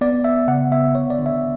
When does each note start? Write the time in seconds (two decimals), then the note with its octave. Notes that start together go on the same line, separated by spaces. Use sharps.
0.01 B3 D5
0.24 B3 E5
0.48 C#3 F#5
0.71 B3 E5
0.95 D3 C#5
1.10 D5
1.19 D3
1.26 E5